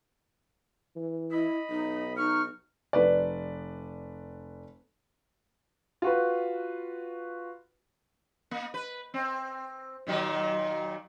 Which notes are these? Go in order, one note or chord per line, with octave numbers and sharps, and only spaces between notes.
E3
E4 D#5 B5
B1 D#4
D#4 C#6 F6
F1 B4 D5
F4 F#4 B4
A#3
B4
C4
A#2 D#3 F#3